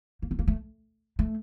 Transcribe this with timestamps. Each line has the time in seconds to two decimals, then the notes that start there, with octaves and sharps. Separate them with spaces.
0.22 A#3
0.31 C4
0.39 A#3
0.48 A3
1.19 A3